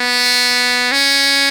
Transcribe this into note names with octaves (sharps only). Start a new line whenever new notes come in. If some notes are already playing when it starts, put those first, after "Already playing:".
Already playing: B3
C#4